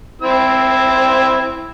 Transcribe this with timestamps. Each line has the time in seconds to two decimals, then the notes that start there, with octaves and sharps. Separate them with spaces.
0.22 C4 E4 E6